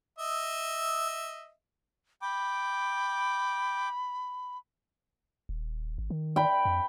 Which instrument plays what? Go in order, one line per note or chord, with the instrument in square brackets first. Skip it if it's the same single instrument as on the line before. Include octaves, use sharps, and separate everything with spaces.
[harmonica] D#5 E5
[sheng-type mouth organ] G5 D6 [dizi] B5
[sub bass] D#1
G#1
D#3
[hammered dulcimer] G5 B5
[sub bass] F2